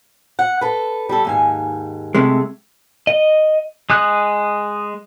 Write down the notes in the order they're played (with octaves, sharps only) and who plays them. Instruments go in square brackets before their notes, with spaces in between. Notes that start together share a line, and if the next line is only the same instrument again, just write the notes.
[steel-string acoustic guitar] F#5
A4 B4
G3 A4
D#2 G#2 G#5
[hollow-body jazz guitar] C3 G#3 [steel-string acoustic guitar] A3
[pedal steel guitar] D#5
G#3 D#6 F#6